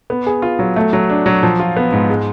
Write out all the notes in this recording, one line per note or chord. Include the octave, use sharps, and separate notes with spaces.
B3
G#4
F4
F#3
A3
F#3
D4
F#3
F3
F4
B3
G#2
G#3